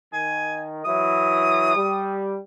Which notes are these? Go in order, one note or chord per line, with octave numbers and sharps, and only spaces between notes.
D#3 G#5
E3 F#3 E4 D#6
G3